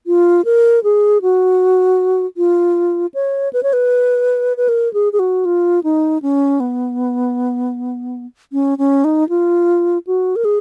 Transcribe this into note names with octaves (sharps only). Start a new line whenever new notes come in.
F4
A#4
G#4
F#4
F4
C#5
B4
C#5
B4
B4
A#4
G#4
G#4
F#4
F4
D#4
C#4
B3
C#4
C#4
D#4
F4
F#4
A#4
G#4